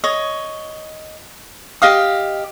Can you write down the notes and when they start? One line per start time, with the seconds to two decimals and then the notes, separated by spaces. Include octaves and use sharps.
0.04 C#5 D#5
1.82 G4 D#5 F5 D#6